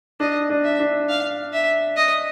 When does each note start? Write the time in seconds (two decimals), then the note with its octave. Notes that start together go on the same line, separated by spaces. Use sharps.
0.20 D4 D#5
0.50 D4
0.64 E5
0.79 D4
1.09 F5
1.53 E5
1.97 D#5